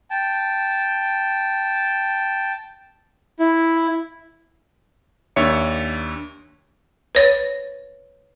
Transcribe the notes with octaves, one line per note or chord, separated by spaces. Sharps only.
G5 A5
E4
D#2 D4 C#5 E5 C#7
B4 C#5 A6